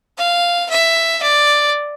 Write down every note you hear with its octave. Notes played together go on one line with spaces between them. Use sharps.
F5
E5
D5